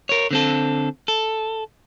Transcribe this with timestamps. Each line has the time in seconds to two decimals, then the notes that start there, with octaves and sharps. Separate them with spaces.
0.09 A#4 C#5
0.31 D3 C4 A4
1.08 A4